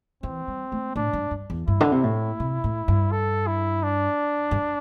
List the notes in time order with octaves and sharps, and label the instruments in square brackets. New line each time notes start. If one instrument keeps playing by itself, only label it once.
[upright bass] E3 [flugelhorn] C4
[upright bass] G3
A3
[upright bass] A2 [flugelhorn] D4
[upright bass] G2
G2
E2
[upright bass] G2 [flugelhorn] E4
[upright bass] D3
C3
A2
C3
A2
G2
[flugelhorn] A4
E4
D4
[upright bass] G2